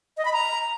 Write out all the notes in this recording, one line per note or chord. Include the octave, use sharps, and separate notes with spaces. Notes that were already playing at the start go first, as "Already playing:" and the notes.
D#5
B5
A#5